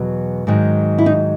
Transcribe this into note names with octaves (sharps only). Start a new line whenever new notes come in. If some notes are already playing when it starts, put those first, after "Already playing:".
Already playing: E2 B2 F#3
G#2 D#3 F#3
E4
D#4